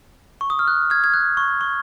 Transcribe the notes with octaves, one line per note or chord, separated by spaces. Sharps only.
C#6
D#6
F6
F#6
F6 G#6
G#6
F#6
C#6
C#6